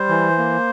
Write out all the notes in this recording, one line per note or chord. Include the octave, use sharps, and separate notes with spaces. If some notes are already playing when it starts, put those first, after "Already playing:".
Already playing: G3 C5
E3
A#3